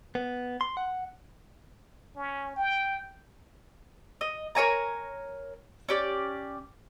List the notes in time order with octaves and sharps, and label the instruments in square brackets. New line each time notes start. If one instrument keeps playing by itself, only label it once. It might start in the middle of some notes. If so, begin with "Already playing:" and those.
[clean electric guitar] B3
C6
F#5
[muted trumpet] C#4
G5
[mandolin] D#5
A#4 C#5 G#5 A#5
C#4 G4 D5